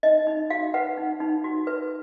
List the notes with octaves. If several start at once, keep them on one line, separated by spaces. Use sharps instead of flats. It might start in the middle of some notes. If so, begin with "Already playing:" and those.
D#4 D#5
D#4
F#4 F5
B4 F#5
D#4
D#4
F#4
B4